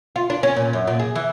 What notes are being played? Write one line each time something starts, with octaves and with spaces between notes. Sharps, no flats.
F4
D4
C#4
A#2
F#2
A#2
G#4
E3